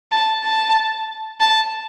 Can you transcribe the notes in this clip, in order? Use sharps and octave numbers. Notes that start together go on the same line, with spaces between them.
A5
A5
A5